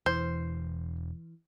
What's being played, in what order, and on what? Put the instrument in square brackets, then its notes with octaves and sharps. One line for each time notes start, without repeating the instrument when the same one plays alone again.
[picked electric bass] E1 [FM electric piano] E3 [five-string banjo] C5